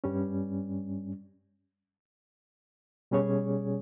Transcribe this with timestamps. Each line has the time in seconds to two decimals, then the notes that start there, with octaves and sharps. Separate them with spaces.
0.04 G2 G3 C#4
3.11 B2 G3 C#4 G#4 C#5